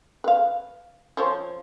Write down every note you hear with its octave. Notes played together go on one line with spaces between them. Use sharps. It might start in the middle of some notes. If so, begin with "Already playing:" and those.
B4 F5
F3 C5 C#5